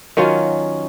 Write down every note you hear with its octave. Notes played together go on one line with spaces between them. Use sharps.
D#3 F#3 C#4 F4